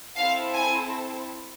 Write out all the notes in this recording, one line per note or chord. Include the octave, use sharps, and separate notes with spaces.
C4 E4 A4 F5
G#5